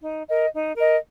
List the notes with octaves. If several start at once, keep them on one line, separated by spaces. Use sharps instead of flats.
D#4
A#4 D#5
D#4
A#4 D#5